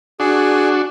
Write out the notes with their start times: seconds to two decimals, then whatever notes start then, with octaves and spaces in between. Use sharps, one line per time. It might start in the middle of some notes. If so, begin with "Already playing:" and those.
0.20 D4 F#4 G#4